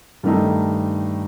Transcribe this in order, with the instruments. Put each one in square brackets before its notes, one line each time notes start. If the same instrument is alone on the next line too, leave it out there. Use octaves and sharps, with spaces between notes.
[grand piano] G2 D#3 A3 D#4